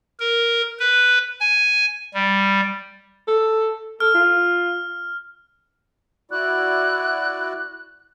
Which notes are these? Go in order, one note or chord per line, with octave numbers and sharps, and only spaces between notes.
A#4
B4
G#5
G3
A4
A4 F6
F4
E4 F#4 D5 F#6